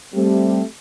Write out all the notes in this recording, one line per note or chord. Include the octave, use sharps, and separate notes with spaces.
G3 A3 C4 G4